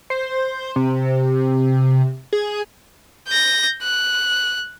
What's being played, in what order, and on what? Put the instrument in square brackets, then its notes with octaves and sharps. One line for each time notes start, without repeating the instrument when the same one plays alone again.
[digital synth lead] C5
C3
G#4
[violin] G6 A#6
F#6